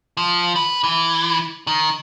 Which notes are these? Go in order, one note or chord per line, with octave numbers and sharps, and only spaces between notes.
F3
B4
E3
D#3